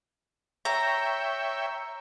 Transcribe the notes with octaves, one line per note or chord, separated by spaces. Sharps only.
C#5 E5 G5 A#5